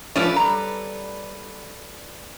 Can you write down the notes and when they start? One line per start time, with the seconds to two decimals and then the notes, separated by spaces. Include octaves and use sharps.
0.16 F3 A3 C#4 A4 B4 D5
0.36 G3 A#5